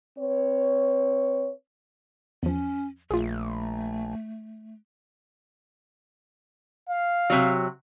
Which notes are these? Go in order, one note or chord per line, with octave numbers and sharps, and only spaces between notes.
C4 B4 C#5
E2 F3 C#4
A#1 A3 F4 G#4
F5
C3 F#3